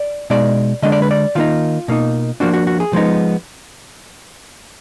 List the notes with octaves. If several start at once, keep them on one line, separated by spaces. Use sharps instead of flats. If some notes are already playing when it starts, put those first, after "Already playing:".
Already playing: D5
B2 G#3 D#4 D5
D3 G#3 D4 D#5
D5
B4
D5
D#3 A#3 D#4 F4
B2 A#3 D#4
F3 A#3 D4 F#4
F#4
F#4
G#4
F3 G#3 B3 D#4